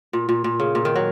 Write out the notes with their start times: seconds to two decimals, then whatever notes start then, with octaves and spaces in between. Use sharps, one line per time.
0.13 A#2
0.29 A#2
0.44 A#2
0.60 C#3
0.75 A#2
0.85 D#3
0.96 F#3